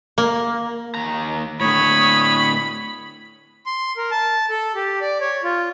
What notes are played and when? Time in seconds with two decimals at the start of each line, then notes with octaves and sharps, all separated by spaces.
0.18 A#3
0.95 D#2 A#5
1.60 A2 D3 C#5 B5 D#6
3.66 C6
3.97 A#4
4.11 A5
4.50 A4
4.75 G4
5.01 D5
5.21 C#5
5.44 F4